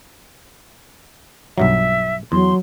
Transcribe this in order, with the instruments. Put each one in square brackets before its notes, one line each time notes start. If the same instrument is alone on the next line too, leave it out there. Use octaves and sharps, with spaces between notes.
[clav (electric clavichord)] B1 G2 F#3 [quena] E5
[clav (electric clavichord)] E2 [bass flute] F#3 [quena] C6